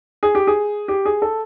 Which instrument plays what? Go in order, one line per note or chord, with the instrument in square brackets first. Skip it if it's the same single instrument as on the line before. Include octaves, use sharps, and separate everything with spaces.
[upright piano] G#4
G4
G#4
G4
G#4
A4